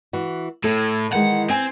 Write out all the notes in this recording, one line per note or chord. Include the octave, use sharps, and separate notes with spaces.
E3 F#4
A2 A4
D#3 E3 G#3 F#5
C4 G#5